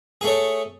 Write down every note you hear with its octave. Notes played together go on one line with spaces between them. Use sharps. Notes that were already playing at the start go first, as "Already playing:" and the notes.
A3 G#4 C#5